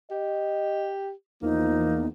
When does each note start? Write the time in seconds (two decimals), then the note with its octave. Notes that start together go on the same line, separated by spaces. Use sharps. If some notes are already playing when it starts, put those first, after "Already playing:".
0.11 G4 D#5
1.42 E2 F3 A#3 D#4